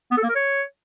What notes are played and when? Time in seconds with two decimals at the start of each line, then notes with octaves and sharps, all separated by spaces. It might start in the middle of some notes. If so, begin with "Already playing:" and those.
0.11 B3
0.17 A4
0.23 A#3
0.29 A#4
0.35 C#5